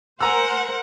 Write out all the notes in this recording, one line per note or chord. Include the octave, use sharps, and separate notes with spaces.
A#4 C5 F#5 G#5 A#5 E6